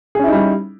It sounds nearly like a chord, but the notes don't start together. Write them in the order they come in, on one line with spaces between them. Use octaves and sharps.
G#4 C#4 E4 D#4 G3